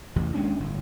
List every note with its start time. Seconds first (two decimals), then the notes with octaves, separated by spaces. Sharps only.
0.16 A1 E2 C3
0.34 D#2 G#3 C#4 D4
0.60 G1 A2